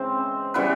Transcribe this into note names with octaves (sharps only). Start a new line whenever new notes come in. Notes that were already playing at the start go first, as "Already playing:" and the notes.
Already playing: C#3 E3 G#3 C4 C5
C#3 E3 G3 B3 B4